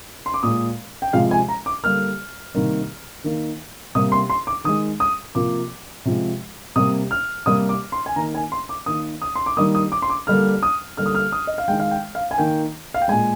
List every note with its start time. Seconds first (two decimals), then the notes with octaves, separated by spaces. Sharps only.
0.26 C6
0.34 D6
0.43 A#2 G#3 D#6
1.02 G5
1.13 C3 F3 G#3 F5
1.31 G#5
1.48 A#5
1.66 D6
1.84 D3 G3 A#3 F6
2.54 C3 D#3 G3 A#3
3.24 D#3 A#3
3.95 C3 G3 A#3 D#6
4.12 C6
4.30 C6
4.47 D6
4.64 D#3 G#3 D#6
5.00 D#6
5.35 C3 F3 A#3 D6
6.05 C3 F3 G#3
6.76 C3 G3 A#3 D#6
7.11 F6
7.46 C3 G3 A#3 D#6
7.69 D6
7.92 C6
8.06 G#5
8.16 D#3 A#3 A#5
8.35 G#5
8.52 C6
8.69 D6
8.86 D#3 A#3 D#6
9.22 D#6
9.35 C6
9.46 D6
9.57 D#3 G3 A#3 D#6
9.75 D#6
9.92 D6
10.02 C6
10.10 D6
10.27 D3 G3 A#3 F6
10.63 D#6
10.97 D3 G3 A#3 F6
11.06 D#6
11.15 F6
11.32 D#6
11.47 D#5
11.58 F5
11.68 G#3 G5
11.72 D#3
11.80 F5
11.91 G5
12.15 F5
12.31 G#5
12.38 D#3 A#3 G5
12.94 F5
13.02 G5
13.08 A#2 G#3 G#5